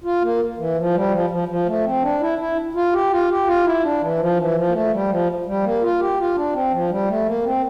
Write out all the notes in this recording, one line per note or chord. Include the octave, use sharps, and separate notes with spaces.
F4
A#3
E3
F3
G3
F3
F3
F3
A3
C4
D4
E4
E4
F4
G4
F4
G4
F4
E4
D4
E3
F3
E3
F3
A#3
A3
G3
F3
G3
A#3
F4
G4
F4
D4
C4
F3
G3
A3
A#3
C4